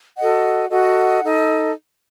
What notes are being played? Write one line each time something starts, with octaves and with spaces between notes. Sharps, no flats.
F#4 A4 D#5 F#5
F#4 A4 D#5 F#5
D#4 A4 D#5